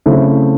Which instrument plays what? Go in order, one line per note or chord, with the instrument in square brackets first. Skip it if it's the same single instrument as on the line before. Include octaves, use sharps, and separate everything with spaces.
[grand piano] C#3 F#3 A3 C4 E4